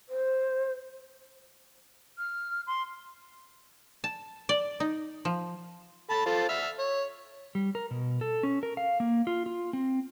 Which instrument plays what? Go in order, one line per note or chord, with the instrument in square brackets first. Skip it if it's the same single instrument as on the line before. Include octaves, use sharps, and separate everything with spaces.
[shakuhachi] C5
[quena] F6
C6
[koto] A5
D5
D#4
F3
[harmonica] A4 A5 B5
F4 A4 C5
E5 E6 F6
C#5
[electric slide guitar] G3
A#4
B2
A4
C#4
A#4
F5
A#3
F4
F4
C4